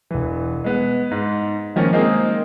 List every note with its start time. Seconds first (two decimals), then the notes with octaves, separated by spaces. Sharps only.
0.11 E1 E3
0.64 G#3 B3
1.11 G#2
1.76 D#3 F3 A#3 C#4
1.93 G#3 A#3 C4 D#4 G#4